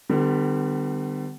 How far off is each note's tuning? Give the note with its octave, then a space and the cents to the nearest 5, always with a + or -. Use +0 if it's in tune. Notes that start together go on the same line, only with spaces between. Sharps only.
D3 +40 G3 +0 B3 +40